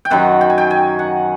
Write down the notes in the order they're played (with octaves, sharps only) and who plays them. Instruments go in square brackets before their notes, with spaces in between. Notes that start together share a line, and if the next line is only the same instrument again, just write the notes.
[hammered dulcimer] G5
F#2 D#3 F#3 F#5
G5
G#5
G5
G#5
F#5